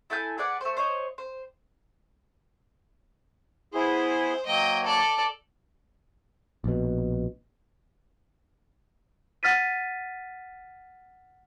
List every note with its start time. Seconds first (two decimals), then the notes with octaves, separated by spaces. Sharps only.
0.10 E4 A4 G#5 G6
0.38 G#4 B4 D5 F#5
0.61 A3 C5
0.77 C5 C#5 D#5
1.18 C5
3.74 B3 E4 G#4 C5
4.46 F#3 A#3 D#5 G5
4.85 A4 D5
6.64 A#1 B2
9.43 F#5 F6 A6 B6 D#7